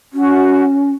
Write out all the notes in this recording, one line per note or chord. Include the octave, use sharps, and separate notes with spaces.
C#4 F#4